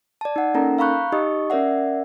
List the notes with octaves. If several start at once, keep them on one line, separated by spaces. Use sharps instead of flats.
D5 A5
D#4 F#5
A#3 C#4 D#4 A4 A#4 A#5
F5 A#5 B5 C#6 F#6 G6
D#4 G4 D#5 C#6 D#6
C#4 A#4 D5 E5 F#5